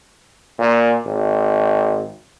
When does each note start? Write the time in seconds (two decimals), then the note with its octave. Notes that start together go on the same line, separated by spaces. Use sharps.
0.59 A#2
1.06 G#1